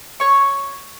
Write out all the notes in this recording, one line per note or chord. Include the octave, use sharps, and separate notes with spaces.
C#5 C#6